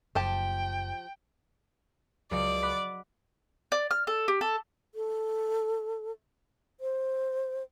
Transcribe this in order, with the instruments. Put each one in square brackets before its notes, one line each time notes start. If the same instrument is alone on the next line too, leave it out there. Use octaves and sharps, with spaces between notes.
[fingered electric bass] F#1 [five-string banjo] F3 G4 A5 [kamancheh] G5
[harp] C#2 C#3 F#3 [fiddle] D5
[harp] F#5 B5 D6
[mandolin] D5
F6
A4
G4
A4
[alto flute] A4
C5